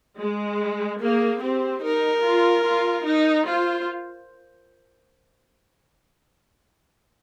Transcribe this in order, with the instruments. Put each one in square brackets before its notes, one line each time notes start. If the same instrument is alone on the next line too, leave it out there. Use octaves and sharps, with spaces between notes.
[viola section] G#3
[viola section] A#3 [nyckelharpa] G#4
[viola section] C4 [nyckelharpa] G4
[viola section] D#4 [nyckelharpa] A#4
[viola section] F4
F4
D#4
[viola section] F4 [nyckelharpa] C5